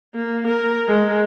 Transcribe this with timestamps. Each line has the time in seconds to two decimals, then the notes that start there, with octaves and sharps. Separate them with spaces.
0.15 A#3
0.47 A#4
0.88 G#3